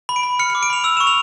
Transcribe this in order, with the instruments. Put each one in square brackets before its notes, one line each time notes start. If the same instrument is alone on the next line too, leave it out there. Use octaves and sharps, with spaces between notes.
[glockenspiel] B5
D7
B5
F6 C#7
C#7
D6
D7
B5 F7
E6 F7
C#6 E7
F7